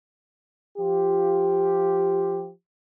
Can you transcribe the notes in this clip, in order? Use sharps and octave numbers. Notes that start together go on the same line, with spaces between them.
F3 F4 G4